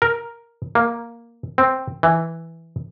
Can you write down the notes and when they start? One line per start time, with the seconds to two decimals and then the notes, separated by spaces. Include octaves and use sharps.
0.02 A#4
0.75 A#3
1.58 C4
2.03 E3